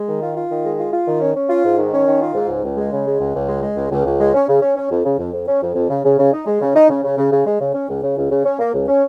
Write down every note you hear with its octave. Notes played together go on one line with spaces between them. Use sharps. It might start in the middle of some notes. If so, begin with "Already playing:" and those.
Already playing: G#3
D#3
F4
F4
D#3
G#3
F4
F4
D#3
C#4
C#4
F4
G#2
D#3
C#4
D#3
F4
G#2
C#2
C#2
G#3
C#3
G#3
C#2
C#2
G#3
G#3
C#2
C#2
C#2
G#3
C#4
C#3
C#4
C#4
F2
C#3
F2
F2
C#4
F2
F2
C#3
C#3
C#3
D#4
G#3
C#3
D#4
C#3
C#3
C#3
C#3
G#3
C#3
C#4
C#2
C#3
C#2
C#3
C#4
A#3
C#2
C#4